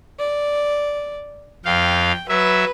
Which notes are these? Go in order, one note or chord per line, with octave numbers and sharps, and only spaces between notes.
D5
F2 F5 G5
F#3 B4 E5